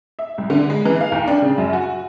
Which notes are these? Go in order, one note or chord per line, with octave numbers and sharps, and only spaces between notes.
E5
C2
D3
G#3
E3
F5
D#2
D4
C#3
F#2
F#4